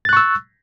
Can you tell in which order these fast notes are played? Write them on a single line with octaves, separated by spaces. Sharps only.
A6 F#6 C#6 E6